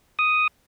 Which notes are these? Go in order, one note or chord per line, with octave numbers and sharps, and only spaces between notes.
D#6